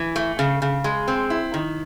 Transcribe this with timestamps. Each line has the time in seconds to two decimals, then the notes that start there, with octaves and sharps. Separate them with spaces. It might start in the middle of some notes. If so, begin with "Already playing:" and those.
Already playing: E3
0.16 A3
0.39 C#3
0.62 C#3
0.84 G#3
1.08 C4
1.30 E4
1.54 D#3